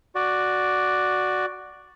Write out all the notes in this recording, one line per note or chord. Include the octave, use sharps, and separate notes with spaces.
F#4 D5